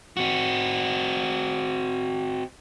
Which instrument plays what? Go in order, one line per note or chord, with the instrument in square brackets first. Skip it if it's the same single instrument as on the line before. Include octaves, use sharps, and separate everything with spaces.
[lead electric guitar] C4 F#4